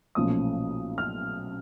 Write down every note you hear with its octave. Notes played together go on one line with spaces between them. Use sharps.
B1 A#2 F3 A3 C#4 D#6
F6